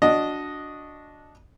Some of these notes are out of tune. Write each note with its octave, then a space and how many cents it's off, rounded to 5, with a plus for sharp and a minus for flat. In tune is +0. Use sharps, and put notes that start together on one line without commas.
D4 -10 F#4 -15 D#5 +0